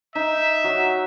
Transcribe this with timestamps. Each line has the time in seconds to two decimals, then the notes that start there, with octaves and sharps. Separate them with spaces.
0.15 D#4 E5
0.64 F#3 F#4